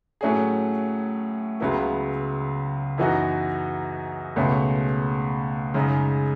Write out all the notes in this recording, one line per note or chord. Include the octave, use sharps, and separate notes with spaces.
A2 F#3 A3 C#4 G#4
C#2 C#3 F#3 B3 E4
F#2 E3 B3 D#4 F#4
C#2 B2 A3 C#4
F#2 C#3 G#3 D#4